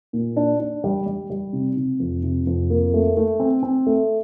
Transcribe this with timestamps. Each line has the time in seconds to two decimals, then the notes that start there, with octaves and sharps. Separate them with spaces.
0.13 A#2
0.36 D4
0.60 D4
0.84 G3
1.07 G3
1.30 G3
1.53 C3
1.76 C3
2.00 F2
2.23 C3
2.47 F2
2.70 A#3
2.94 A3
3.17 A3
3.40 C4
3.63 C4
3.87 A3